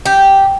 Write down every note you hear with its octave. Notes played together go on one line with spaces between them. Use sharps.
G4